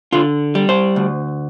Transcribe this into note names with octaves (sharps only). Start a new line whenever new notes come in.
D3 F4
G3
C5
D2